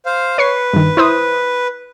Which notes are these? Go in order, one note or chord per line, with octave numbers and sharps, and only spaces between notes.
C5 F5
B4 C#5 C#6 C7
G2 D#3
E4 C5 D#6